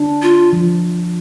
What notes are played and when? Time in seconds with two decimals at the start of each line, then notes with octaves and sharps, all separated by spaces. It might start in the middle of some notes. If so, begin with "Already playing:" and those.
Already playing: D4
0.22 F4
0.53 F3